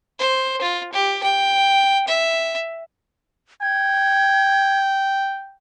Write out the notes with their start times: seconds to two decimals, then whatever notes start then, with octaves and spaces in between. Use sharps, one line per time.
0.19 C5
0.61 F4
0.93 G4
1.23 G5
2.08 E5
3.62 G5 G#6